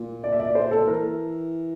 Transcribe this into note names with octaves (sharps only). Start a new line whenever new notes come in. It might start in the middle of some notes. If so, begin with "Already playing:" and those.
Already playing: A#2
D5
E5
D5
C5
A4
E3 A#4